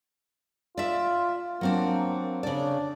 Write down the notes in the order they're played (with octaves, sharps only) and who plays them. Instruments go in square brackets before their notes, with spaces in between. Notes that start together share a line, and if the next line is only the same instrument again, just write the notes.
[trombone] F4 [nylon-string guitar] D5 E5
[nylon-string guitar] F#3 C4 D4 [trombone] A#3
[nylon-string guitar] C#3 D5 [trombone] D4